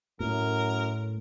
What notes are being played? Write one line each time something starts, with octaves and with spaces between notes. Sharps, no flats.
F#2 A2 A#4